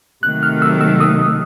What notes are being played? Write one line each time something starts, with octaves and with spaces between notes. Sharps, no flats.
C3 D#3 F#3 A3 F#6
F6
E6
E6
D#6